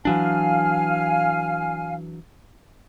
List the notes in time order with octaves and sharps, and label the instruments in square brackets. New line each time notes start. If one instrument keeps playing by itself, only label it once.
[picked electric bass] E3 F#3 D4 [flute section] F5 G#5 F6